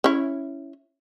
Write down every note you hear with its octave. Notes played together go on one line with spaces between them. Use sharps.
C#4 E4